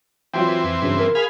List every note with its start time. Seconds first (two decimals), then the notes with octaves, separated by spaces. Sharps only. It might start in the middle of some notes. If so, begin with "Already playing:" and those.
0.34 E3 F#3 C4 F4 G5
0.64 F2
0.82 G2 C#3 F#3
0.99 A#4
1.15 G#4 F5 B5